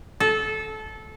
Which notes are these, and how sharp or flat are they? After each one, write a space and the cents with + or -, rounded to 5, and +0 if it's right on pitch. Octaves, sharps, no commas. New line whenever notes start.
A4 -20